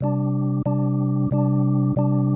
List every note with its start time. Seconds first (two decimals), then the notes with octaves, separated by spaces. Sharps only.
0.01 C3 G3 D4
0.66 C3 G3 D4
1.31 C3 G3 D4
1.96 C3 G3 D4